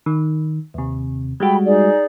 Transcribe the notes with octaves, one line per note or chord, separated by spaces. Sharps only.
D#3
D#2 C3
G3 G#3 F#4 G5 B5
D#4 G#4 D5